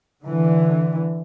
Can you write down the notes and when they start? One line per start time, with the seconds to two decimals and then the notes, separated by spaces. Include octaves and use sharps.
0.24 D3 E3